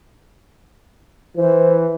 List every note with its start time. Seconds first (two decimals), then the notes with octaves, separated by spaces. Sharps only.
1.36 E3 C5